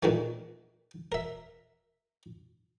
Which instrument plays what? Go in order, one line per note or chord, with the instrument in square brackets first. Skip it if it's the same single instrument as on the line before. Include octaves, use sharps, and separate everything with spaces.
[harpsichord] A#2 D#3 E3 G#3 A3
A#4 E5